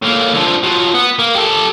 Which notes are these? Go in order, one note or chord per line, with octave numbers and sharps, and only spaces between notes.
A2 A#3
D3 F3
F3 F#3
B3
A#3
G4 A4